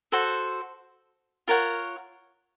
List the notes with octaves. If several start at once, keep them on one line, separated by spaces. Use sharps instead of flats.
F#4 A4 C5
F4 A#4 C#5 F#5